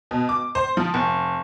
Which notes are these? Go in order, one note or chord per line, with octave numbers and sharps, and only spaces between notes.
B2
D6
C5
F3
F1